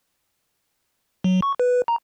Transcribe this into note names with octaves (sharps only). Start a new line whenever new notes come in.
F#3
C#6
B4
A#5